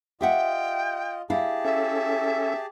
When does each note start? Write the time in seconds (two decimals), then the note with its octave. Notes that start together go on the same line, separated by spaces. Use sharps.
0.21 F4 G4 D#5 E5 F#5 G5
1.30 E4 G4 G#4 F5 A5
1.64 C#4 A4 E5